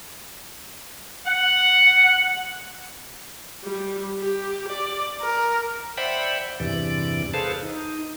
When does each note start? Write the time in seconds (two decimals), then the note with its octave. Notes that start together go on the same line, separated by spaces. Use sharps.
1.27 F#5
3.63 G3
4.19 G4
4.68 D5
5.22 A#4
5.97 C5 D5 E5 F#5 G5 B5
6.60 E2 G2 C3 E3 D5
7.34 G#4 A4 B4 C5 F5 A5
7.63 D#4